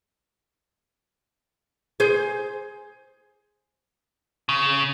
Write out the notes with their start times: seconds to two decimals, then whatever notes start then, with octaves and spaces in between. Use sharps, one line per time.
2.00 G#4 C5
4.49 C#3